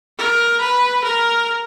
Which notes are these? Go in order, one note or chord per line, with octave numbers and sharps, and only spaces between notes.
A#4
B4
A#4